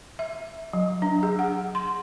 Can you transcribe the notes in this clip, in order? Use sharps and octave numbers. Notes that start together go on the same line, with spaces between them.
E5
F#3
D4
G#4
F#5
C6